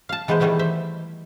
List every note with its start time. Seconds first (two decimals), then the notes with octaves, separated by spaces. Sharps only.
0.09 F5 A5
0.28 E3 G#3 B3 B4 C5
0.40 D#3 E3 G3 A3 B3 E4
0.59 C5 E5